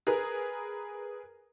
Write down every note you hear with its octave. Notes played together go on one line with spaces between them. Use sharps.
G#4 A#4 B4